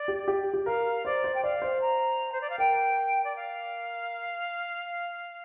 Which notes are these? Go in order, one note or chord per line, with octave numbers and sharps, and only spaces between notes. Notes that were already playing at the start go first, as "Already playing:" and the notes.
Already playing: D5
G4
G4
G4
A#4 F5
C5 D5
C5
G5
D5 F5
C5
A#5
C5
D5
F5
A#4 G5
D5
F5